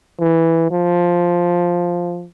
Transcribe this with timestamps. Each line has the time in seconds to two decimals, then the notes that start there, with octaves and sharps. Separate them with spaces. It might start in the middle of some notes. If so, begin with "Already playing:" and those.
0.20 E3
0.71 F3